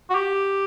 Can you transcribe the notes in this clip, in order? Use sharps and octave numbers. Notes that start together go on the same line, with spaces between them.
F#4
G4